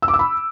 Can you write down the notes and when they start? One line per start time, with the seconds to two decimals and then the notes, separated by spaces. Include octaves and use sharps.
0.02 E6
0.08 D6
0.14 E6
0.19 B5